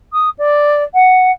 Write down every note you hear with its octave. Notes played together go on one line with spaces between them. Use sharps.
D#6
D5
F#5